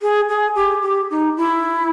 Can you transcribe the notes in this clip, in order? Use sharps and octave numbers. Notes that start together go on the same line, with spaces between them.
G#4
G#4
G4
G4
D#4
E4